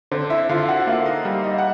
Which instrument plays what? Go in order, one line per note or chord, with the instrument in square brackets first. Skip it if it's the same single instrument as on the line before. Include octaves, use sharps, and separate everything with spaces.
[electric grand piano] D3 [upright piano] C4 C5
[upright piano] E4 E5
[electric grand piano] D3 [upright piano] F4 F5
[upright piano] F#4 F#5
[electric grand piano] A#3 [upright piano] F4 F5
[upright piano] D#4 D#5
[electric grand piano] G3
[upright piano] D#4 D#5
F#5